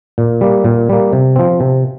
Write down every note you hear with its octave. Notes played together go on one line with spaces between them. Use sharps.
A#2
G3 A#3
A#2
G3 A#3
C3
F3 C4
C3